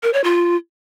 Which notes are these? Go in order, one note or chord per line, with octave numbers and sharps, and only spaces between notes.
A#4
C#5
F4